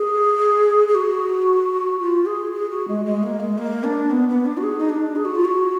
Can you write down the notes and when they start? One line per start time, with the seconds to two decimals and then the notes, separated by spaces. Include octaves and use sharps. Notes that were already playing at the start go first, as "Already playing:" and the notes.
Already playing: G#4
0.88 G#4
0.95 F#4
2.00 F4
2.26 G#4
2.53 G#4
2.70 F#4
2.88 G#3
3.05 G#3
3.23 A#3
3.40 G#3
3.58 A#3
3.84 D4
4.11 B3
4.28 B3
4.45 D4
4.57 F#4
4.63 G#4
4.78 D#4
4.89 D4
5.16 G#4
5.25 F#4
5.35 F4
5.45 F#4